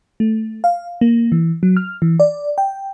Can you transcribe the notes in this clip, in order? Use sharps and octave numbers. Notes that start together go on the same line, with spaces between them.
A3
F5
A#3
E3
F#3
F6
E3
D5
G5